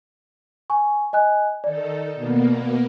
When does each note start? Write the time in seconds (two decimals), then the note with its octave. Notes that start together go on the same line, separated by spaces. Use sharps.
0.70 G#5 C#6
1.13 D#5 G#5 F#6
1.64 D#3 D#4 A4 D5
2.15 B2 A#3 B3